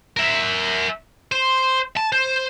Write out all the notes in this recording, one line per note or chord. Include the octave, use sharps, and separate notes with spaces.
A#4 E5
C5
A5
C5